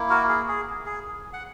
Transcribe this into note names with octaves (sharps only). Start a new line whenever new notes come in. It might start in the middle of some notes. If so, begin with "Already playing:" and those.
Already playing: A#3 E4
F#4 A#4
G#4
G#4
G#4
F#5